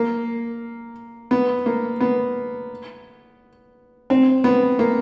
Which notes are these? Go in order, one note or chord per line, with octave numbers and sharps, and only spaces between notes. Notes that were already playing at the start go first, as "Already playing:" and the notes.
Already playing: A#3
B3
A#3
B3
C4
B3
A#3